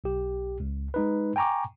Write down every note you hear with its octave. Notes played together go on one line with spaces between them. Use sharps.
B1 G4
C#2
G#3 D#4 B4
G5 G#5 A#5 C#6 D6